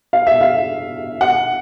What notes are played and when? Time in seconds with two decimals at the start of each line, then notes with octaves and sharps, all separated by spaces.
0.13 F5
0.27 E5
0.41 F5
1.21 F#5